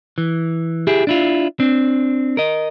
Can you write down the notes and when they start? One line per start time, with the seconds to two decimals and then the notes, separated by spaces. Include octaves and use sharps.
0.18 E3
0.87 E4 G4 G#4
1.07 D4 E4 F4
1.60 C4 D4
2.37 A#4 D#5